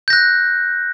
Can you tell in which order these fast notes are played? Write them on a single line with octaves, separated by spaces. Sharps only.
G6 A#6 F#6